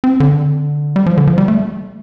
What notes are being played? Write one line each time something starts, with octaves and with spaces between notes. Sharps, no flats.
C4
D3
G3
F3
D3
F3
G3
A3